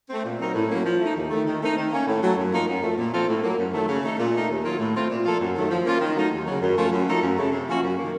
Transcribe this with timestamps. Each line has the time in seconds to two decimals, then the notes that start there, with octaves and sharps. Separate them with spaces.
0.09 A3 C4
0.24 A#2
0.39 F#3 C4 D#4 A#4
0.55 A2
0.69 F#3 A#3 C#4
0.84 F3
1.00 A3 D#4
1.15 D#2
1.30 D#3 A3
1.45 D#3
1.60 A3 C4 D#4
1.76 D#3
1.91 A#3 C#4
2.06 A2
2.21 F#3 A3
2.37 F#2
2.52 F3 A#3 D#4 A#4
2.66 F#2
2.82 F3 A3
2.97 A#2
3.12 F3 C4 F4 A4
3.27 A2
3.43 F#3 A#3
3.58 F#2
3.73 D#3 F#3 A3
3.88 C#3
4.03 A3 D#4 A4
4.18 A#2
4.34 A3 D#4 A#4
4.48 D#2
4.64 D#3 F#3 A#3 F4
4.78 A2
4.94 A3 C4 F4
5.09 A#2
5.24 F3 A#3 F4 A4
5.39 F#2
5.55 D#3 F#3 A3
5.70 F3
5.85 A#3 C#4 F4
6.00 D#3
6.15 F#3 A3 D#4
6.30 D#2
6.45 C#3 F#3
6.60 F#2
6.76 F3 A3 C#4 F4
6.91 F#2
7.06 F3 A3 D#4 A4
7.21 F#2
7.37 C#3 A3
7.52 C3
7.67 F3 A#3 C#4 F#4
7.82 F#2
7.97 D#3 A#3